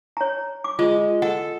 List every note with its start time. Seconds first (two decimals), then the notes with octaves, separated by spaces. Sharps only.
0.17 C#5 A#5
0.64 D6
0.79 G#3 F4
1.22 A4 F#5